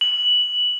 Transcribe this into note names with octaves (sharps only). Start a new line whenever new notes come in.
F#7